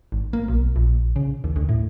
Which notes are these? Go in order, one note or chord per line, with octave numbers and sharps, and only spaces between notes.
G#1
A#3
B1
A#1
C#3
D#2
D2
A2